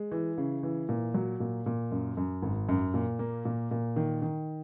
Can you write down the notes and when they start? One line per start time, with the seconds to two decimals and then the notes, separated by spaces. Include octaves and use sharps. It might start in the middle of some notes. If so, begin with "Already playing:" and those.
Already playing: G#3
0.12 E3
0.38 C#3
0.63 E3
0.89 A#2
1.14 F#3
1.40 A#2
1.66 A#2
1.91 F#2
2.17 F#2
2.42 G#1
2.69 F#2
2.94 A#2
3.19 A#3
3.45 A#2
3.71 A#2
3.96 D#3
4.22 D#3